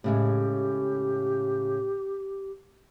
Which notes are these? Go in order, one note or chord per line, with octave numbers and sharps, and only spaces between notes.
A2 C#3 G#3 G4